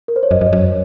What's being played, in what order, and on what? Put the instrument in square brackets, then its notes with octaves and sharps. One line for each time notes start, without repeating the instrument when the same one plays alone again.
[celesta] A#4
C5
C#5
[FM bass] F#2 [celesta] D#5
[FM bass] F#2 [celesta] D#5
[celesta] C#5
[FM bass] F#2